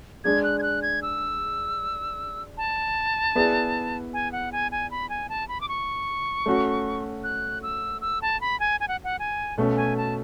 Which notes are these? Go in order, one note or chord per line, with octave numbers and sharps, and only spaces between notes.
G#3 D4 G#4 G#6
F#6
G#6
F#6
G#6
E6
A5
B3 E4 G#4 B4 D5
G#5
F#5
G#5
G#5
B5
G#5
A5
B5
D6
C#6
A3 C#4 F#4
F#6
E6
E6
A5
B5
G#5
G#5
F#5
F#5
G#5
B2 A3 C#4
G#5
A5